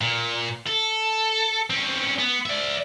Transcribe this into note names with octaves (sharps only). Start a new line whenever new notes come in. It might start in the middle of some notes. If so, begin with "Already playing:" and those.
A#2
A4
C4 C#4
B3
D5 E5